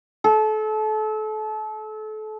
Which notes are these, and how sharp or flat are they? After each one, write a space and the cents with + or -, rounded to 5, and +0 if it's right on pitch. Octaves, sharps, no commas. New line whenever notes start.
A4 -30